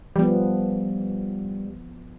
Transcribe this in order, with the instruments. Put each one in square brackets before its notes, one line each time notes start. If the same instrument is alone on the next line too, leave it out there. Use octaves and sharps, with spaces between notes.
[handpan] F3 B3 [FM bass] G3